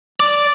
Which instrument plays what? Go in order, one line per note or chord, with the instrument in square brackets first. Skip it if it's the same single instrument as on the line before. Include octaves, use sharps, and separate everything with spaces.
[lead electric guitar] D5